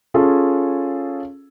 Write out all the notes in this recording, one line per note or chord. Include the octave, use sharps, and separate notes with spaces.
C#4 F4 G#4 A4